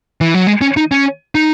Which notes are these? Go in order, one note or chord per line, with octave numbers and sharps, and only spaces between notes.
E3
F#3
G#3
C#4
D#4
C#4
D#4